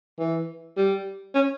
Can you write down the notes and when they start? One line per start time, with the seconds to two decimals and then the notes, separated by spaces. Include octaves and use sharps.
0.19 E3
0.77 G3
1.35 C#4